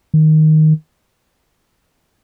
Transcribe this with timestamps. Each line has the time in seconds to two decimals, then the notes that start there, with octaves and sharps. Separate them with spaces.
0.14 D#3